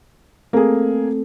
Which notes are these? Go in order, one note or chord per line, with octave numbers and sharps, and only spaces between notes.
A3 A#3 C4 G#4 A4